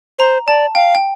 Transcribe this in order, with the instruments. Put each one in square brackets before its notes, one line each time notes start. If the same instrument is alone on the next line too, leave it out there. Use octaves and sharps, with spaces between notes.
[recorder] C5 [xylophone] A#5
[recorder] D5 [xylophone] A5
[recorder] F5 [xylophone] G5
[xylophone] G5